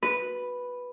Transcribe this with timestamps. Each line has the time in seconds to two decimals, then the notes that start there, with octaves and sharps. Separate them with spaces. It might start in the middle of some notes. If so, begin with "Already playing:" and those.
0.03 B4